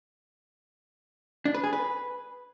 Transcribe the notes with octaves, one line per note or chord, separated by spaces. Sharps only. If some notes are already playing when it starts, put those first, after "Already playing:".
D4
B4
G#4
B4